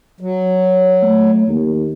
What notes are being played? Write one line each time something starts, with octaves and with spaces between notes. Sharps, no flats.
F#3
A3
D#2